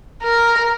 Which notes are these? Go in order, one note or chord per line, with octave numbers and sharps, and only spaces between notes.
A#4